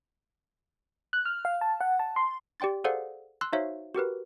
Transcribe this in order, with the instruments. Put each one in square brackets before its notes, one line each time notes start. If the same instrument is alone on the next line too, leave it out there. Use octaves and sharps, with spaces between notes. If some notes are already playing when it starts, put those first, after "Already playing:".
[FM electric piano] F#6
F6
F5
A5
F#5
A5
C6
[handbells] G4 D5 G5 C6 A6
G#4 A4 C5 D5 F5 F#5
C6 E6 F#6
D#4 F#4 C5 C#5 E5 F5
F#4 G4 A#4 B4